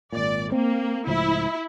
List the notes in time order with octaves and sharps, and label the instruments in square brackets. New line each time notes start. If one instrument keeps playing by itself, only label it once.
[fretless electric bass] G#1 A#2 [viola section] D5
[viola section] A#3 [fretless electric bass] C4
[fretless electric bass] C#2 A2 F3 [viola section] E4